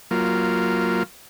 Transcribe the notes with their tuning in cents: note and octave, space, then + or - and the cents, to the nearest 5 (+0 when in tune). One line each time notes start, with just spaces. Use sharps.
F#3 +0 A#3 +0 F4 -10